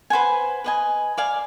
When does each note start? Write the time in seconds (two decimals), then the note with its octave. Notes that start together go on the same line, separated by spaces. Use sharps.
0.10 B4 C5 F#5 G#5
0.64 B4 D#5 G#5
1.18 D5 F5 G#5